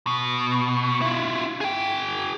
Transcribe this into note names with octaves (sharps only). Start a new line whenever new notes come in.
B2
E4 F4
G#4 G5